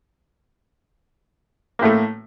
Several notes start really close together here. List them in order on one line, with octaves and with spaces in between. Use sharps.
A#3 A2 A3